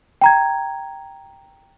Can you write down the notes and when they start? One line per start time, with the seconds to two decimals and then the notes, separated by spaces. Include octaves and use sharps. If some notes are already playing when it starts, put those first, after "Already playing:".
0.21 G5 A#5 G#6